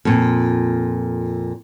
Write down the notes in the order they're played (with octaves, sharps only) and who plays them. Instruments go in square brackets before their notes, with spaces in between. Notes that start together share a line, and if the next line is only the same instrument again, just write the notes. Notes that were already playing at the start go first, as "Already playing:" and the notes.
[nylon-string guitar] F2 A#2